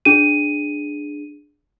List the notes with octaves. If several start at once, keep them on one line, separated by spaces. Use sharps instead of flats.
D4 G#4 D#7